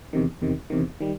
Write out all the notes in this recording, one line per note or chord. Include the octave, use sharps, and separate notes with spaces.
E2 C3 D#3
E2 C3 D#3
E2 C3 D#3
D#3 G3